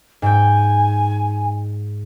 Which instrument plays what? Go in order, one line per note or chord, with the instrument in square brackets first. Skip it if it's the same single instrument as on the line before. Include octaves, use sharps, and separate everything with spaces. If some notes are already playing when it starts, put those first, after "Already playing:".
[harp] G#2 G5 [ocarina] G#5